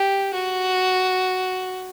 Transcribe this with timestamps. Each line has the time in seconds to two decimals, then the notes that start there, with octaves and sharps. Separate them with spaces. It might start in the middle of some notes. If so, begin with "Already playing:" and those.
Already playing: G4
0.34 F#4